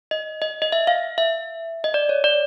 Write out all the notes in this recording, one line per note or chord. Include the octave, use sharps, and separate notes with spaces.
D#5
D#5
D#5
E5
F5
E5
D#5
D5
C#5
D5